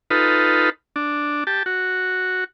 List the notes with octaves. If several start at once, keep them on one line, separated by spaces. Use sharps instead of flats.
D#4 F4 A4 B4
D4
G4 A5
F#4